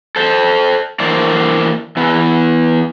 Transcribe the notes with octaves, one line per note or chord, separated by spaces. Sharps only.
A4 C5
E3 A#3 D4 C5 D5
E3 B3